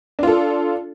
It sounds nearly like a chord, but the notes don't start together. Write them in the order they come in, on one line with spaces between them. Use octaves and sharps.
D4 F4 A4